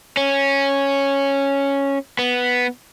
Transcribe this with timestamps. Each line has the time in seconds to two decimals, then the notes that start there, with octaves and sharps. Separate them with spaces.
0.17 C#4
2.19 B3